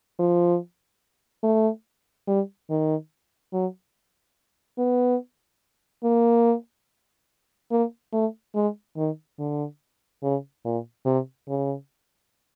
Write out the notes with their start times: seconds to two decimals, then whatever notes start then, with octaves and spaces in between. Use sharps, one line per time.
0.19 F3
1.43 A3
2.27 G3
2.70 D#3
3.53 F#3
4.78 B3
6.03 A#3
7.71 A#3
8.13 A3
8.55 G#3
8.96 D#3
9.39 D3
10.23 C#3
10.65 A#2
11.05 C3
11.48 C#3